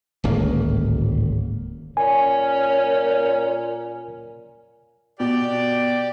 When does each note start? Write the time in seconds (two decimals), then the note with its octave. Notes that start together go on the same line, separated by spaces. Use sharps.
0.24 D1 G#1 C#2 A#3
1.97 A#2 C#4 G#5
5.20 B2 G4 D5